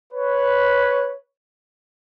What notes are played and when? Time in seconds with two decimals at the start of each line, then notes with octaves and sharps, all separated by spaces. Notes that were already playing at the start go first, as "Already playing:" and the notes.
0.12 B4 C#5